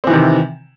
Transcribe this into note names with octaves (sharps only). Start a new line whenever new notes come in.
C3 D#3 E3 C4